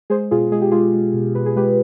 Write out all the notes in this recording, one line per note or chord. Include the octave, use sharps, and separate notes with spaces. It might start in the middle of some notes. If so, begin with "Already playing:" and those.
G#3 G#4 C5
B2 F4 G#4
G#3 G#4
G4
G#3 F4 G#4
G#3
B2
B2 B4
G#4
G#3 G4 B4